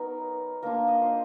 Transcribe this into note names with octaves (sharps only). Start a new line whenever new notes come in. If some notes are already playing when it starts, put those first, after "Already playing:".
Already playing: F#3 B3 D#4 A#4
A#3 D4 F4 A#4
D#5
C5